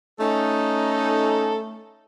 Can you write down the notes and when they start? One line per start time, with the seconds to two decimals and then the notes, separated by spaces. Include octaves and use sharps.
0.20 A3 C#4 D#4 A4